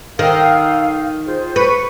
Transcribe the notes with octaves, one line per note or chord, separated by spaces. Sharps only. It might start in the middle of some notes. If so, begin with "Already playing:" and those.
D#3 A4 A#4 F5
F4 G#4 C5
B4 C#6